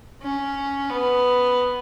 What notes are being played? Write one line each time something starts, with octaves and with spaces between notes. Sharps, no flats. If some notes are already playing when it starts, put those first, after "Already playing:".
C#4
B3